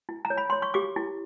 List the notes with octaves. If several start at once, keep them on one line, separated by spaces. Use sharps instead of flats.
E4
A#5
C#5
B5
C#5 C6
C#6
G4 D6
E4